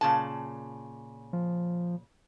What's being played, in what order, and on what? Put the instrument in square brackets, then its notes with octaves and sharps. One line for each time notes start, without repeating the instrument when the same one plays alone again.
[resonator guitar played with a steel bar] A#2 C#3 A5
[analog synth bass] F3